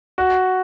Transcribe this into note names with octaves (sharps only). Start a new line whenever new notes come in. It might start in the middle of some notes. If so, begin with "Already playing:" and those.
F#4